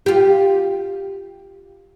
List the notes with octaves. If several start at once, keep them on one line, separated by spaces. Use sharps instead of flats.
F4 G4